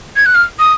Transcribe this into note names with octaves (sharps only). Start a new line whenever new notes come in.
G#6
F#6
F6
D#6